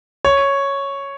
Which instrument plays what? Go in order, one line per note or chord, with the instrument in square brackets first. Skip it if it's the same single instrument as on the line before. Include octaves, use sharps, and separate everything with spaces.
[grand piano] C#5